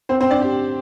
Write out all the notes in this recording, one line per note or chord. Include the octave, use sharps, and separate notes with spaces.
C4 C5
C4 C5
D4 D5
G4